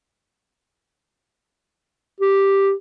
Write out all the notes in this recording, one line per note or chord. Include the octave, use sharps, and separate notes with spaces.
G4